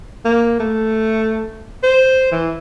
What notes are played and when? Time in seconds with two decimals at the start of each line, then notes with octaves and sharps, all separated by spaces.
0.25 A#3
0.60 A3
1.83 C5
2.32 E3